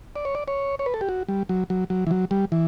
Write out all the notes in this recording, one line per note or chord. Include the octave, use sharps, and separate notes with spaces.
D5
C#5
D5
C#5
C#5
B4
A4
G4
F#4
G3
F#3
F#3
F#3
E3
F#3
G3
E3